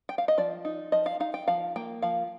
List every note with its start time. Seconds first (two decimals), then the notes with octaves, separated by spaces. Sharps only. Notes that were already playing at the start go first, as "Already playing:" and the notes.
0.09 G5
0.18 F5
0.28 D#5
0.38 F3 D5
0.65 D#4
0.92 F3 D#5
1.06 F5
1.20 D#4 F5
1.34 G5
1.48 F3 F5
1.76 A#3 G5
2.02 F3 F5